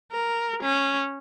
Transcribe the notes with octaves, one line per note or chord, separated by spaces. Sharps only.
A#4
C#4